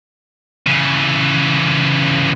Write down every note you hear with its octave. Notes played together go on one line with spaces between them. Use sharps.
C#3 E3